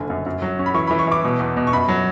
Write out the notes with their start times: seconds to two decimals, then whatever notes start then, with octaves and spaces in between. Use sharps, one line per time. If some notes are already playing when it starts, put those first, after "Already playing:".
Already playing: F#1 D3 G#5
0.10 F#2
0.26 F#2
0.42 F#3
0.59 C#4
0.66 B5
0.74 E3 C#6
0.87 E3 B5
0.99 C#6
1.07 E3 D6
1.24 B2
1.39 E2
1.57 B2
1.67 C#6
1.73 F#2 B5
1.88 F#3